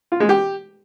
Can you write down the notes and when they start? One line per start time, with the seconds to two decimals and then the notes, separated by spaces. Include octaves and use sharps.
0.12 F4
0.20 G#3
0.29 G4